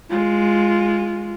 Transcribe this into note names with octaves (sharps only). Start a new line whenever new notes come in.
G#3 F4